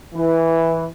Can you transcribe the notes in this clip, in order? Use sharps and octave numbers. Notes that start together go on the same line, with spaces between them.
E3